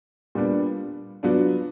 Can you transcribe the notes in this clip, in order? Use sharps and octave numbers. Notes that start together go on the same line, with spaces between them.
A#2 G3 B3 D4
F#3 B3 D4 F4